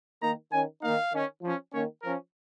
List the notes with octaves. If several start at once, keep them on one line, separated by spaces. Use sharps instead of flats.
D#3 A#3 D#4 A#5
D#3 C#4 G#5
D#3 A#3 D#4 F5
D#3 C#4
F3 C#4
D#3 A#3 C#4 C#5
F3 C#4 A#4